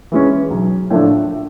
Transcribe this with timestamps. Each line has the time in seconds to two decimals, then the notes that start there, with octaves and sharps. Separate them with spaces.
0.12 E3 G#3 C#4
0.51 B1
0.90 A2 F3 A3 D4